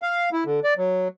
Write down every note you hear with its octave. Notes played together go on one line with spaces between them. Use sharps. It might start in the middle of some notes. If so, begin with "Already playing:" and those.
F5
E4
D3
D5
F#3